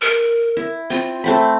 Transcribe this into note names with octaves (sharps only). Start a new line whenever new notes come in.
A#4
E4
C4 F4
A3 C4 B5